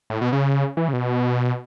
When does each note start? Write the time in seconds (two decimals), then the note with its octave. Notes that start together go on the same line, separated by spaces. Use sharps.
0.10 A2
0.21 B2
0.33 C#3
0.77 E3
0.88 C#3
0.93 B2